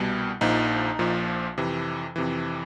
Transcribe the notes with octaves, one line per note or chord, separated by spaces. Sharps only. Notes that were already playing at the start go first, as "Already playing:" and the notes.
Already playing: C2 B2 G3
A#1 A#2 F3 D#4
A#1 A#2 F3
F2 C3 E3
F2 C3 E3